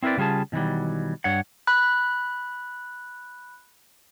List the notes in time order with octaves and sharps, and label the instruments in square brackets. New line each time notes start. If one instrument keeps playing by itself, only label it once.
[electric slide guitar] C4 E4 A#4 B4 D5
C#3 G3 F4 G#4 A5
B2 D#3 E3 F#3 G3
G2 C#5 F#5
[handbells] B5 F#6